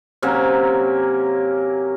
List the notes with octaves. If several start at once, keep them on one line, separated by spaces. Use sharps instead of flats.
C3 F#3 A#3 C#4